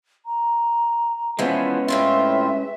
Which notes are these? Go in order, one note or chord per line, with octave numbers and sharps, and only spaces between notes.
A#5
E3 F3 G#3 B3 C#4 B4
A2 C4 F4 E5